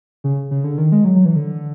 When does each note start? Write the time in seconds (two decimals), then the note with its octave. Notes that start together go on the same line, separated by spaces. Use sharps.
0.24 C#3
0.51 C#3
0.64 D3
0.78 D#3
0.92 G#3
1.05 F#3
1.15 F#3
1.25 E3
1.36 D3